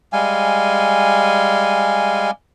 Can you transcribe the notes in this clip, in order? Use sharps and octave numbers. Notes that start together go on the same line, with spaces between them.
G3 G#3 F5 G#5